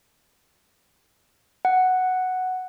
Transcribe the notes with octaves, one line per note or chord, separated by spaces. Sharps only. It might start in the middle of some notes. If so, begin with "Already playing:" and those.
F#5